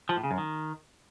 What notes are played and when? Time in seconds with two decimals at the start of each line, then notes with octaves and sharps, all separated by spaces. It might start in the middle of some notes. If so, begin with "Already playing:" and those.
0.09 F3
0.16 A2
0.24 C#3
0.31 F#2
0.38 D#3